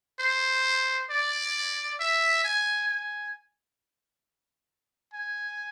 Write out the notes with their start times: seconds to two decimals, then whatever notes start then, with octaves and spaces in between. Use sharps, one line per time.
0.20 C5
1.10 D5
2.00 E5
2.44 G#5
2.89 G#5
5.14 G#5